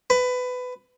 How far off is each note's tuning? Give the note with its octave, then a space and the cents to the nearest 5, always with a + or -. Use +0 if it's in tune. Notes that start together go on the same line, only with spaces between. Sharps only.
B4 +20